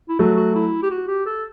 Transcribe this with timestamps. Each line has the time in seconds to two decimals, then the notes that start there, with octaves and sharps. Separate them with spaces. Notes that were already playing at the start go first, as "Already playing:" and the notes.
0.09 E4
0.19 F#3 A3 F#4
0.37 F#4
0.55 E4
0.83 G4
0.91 F#4
1.08 G4
1.26 A4